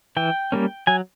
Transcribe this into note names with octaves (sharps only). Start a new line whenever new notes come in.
E3 G5
G3 A#3 C#4
F#3 G#5